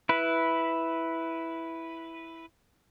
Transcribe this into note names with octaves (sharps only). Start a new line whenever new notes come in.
E4 B4